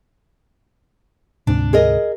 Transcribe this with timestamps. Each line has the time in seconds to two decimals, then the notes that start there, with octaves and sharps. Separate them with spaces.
1.47 D2 G#2 C3 D4
1.73 G#4 A#4 D#5